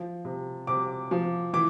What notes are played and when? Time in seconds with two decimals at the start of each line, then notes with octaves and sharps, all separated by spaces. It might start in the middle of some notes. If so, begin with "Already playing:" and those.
Already playing: F3
0.25 C3
0.67 C3 D6
1.11 F3
1.53 E3 D6